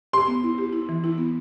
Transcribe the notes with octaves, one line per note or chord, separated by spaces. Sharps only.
G4 C6
B3
E4
G4
E4
E3
E4
B3